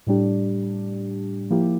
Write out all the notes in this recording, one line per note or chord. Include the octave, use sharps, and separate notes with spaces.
A2 G3 D4 G4
F3 A#3 E4 G4